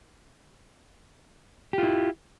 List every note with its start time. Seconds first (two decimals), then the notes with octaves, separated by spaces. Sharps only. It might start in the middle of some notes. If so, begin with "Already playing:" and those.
1.73 G4
1.78 F4
1.83 E4